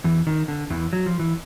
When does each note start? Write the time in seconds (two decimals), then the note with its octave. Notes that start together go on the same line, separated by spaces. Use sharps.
0.04 E2 E3
0.27 D#3
0.48 D3
0.70 E2 E3
0.93 F#3
1.06 F3
1.20 E3